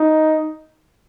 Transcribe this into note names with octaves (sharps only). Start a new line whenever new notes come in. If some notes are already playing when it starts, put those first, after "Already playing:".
Already playing: D#4